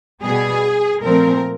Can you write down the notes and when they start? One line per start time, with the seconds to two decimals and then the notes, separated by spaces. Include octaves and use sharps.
0.23 B2 G3 B3 G#4
1.03 A#2 F3 A3 C4 A#4